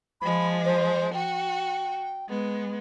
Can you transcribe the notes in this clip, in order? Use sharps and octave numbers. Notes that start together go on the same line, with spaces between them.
F3 G#3 B5
C5
F#4 G5
G#3 B3